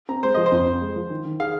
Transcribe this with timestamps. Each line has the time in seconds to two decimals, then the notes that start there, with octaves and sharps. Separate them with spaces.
0.09 C4 A#5
0.23 G#3 C5
0.34 F3 D#5
0.46 C5
0.52 F2
0.66 C4
0.82 G#3
0.96 F3
1.10 D#3
1.25 D#3
1.40 G#4 F5